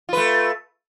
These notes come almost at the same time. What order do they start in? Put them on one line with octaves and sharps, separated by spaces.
F4 B4 A3